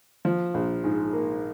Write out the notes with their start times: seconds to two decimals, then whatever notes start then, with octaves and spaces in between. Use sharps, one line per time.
0.25 F3
0.54 A#1
0.84 G#2
1.13 A#3